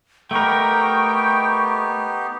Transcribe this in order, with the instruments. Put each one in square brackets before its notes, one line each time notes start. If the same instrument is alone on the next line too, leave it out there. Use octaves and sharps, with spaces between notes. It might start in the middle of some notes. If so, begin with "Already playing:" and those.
[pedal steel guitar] A3 A#4 [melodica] B3 D#4 G4 [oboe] G5 [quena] C#6